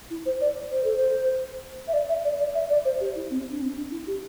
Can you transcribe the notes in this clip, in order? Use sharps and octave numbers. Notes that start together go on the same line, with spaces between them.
E4
C5
D5
C5
A4
C5
E5
D5
E5
D5
D5
E5
D5
C5
G4
E4
C4
D4
C4
D4
E4
G4